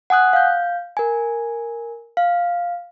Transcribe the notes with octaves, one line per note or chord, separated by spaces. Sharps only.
F#5 G#5 D#6 F#6
F5 G6
A#4 G#5
F5